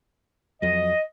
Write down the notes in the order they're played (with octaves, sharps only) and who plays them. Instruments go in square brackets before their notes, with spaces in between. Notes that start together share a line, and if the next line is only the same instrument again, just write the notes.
[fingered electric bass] F2 F#3 [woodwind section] D#5